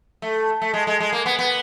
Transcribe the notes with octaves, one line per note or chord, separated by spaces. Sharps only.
A3
A3
G#3
G#3
G#3
A#3
B3
B3